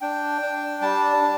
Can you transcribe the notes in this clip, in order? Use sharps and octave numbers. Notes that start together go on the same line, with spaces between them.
D4 G5
D4
G3 A5
D4